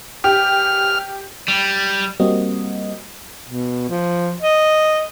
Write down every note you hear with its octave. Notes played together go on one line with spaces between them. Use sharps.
G4 F6
G3
G3 A#3 C4 F#4 D#5
B2
F3
D#5